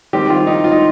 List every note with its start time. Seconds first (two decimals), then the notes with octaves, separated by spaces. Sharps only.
0.13 D#3 G3 C4 G4
0.30 F4
0.47 D#4
0.64 F4
0.72 D#4